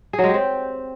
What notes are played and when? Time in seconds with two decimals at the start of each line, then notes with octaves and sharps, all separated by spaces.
0.13 G#4
0.19 F#3
0.24 G#3
0.29 G4
0.34 C4